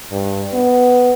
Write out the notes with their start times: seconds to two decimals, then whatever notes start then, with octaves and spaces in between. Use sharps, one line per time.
0.12 G2
0.54 B3